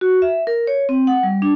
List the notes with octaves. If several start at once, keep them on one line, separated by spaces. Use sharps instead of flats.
F#4
E5
A#4
C#5
C4
F#5
G3
D4